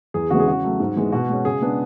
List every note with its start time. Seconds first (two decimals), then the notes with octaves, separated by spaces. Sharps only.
0.14 E2 G#4
0.30 C#3 E3 G#3 B3 F#4
0.40 G#4
0.47 C#3 F#4
0.64 F#3 A3
0.80 G#2
0.96 E3 G#3 B3
1.12 B2 F#4
1.29 G#3 C#4
1.45 C#3 G#4
1.61 G#3 B3 D4